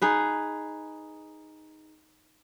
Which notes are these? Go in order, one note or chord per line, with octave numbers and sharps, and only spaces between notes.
D#4 G#4 B4